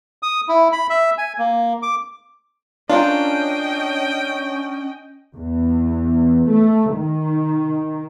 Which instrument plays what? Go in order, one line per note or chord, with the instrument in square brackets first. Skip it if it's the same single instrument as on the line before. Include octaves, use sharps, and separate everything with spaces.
[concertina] D#6
E4
B5
E5
G#5
A#3
D6
[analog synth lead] C#4 [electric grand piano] D4 [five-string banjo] F4 A#4 [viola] D#5 G5
[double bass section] E2
A3
D#3